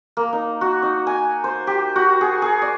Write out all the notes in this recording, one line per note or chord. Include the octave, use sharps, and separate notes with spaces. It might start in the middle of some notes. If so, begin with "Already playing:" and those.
A#3
D#4
F#4
D#4
G#5
C5
G4
F#4
G#4
G#4
D5